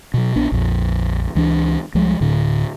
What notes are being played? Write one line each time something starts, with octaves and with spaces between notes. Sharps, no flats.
B2 F#3
A#1 B3 D4
A#1 F2
C#2 E3 B3 D4
C2 F3 G3 G#3
D1 A2 D3